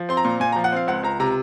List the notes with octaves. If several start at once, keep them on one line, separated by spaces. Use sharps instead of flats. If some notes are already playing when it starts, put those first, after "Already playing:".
Already playing: F3
C4 C6
A#5
A#2
A#2 G#5
A#5
F3
F#5
C4 F5
C#2 F#5
C#2 A#5
C3 A#5